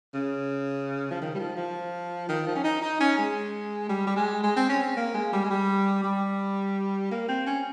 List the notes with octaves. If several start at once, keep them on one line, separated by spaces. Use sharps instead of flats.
C#3
F3
D#3
G3
F3
F3
D#3
F3
C#4
D#4
D#4
C#4
G#3
G3
G3
G#3
G#3
C4
C#4
C4
A#3
G#3
G3
G#3
G3
G3
A#3
C4
C#4